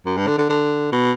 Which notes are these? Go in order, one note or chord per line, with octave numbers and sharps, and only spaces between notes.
F#2
G2
D3
D3
D3
B2